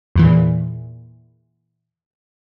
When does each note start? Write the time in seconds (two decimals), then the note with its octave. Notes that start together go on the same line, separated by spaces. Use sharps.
0.16 E2 A#2 E3